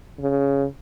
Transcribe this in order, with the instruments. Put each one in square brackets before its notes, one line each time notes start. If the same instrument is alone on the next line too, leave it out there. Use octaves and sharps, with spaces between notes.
[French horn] C#3